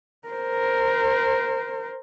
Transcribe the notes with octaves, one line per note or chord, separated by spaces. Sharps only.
A#4 C5